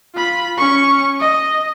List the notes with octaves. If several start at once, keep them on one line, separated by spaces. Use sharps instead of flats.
F4 B5
C#4 C#6
D#5